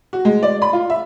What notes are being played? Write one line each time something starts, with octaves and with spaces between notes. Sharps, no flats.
F#4
G#3
D5
B5
F4
E5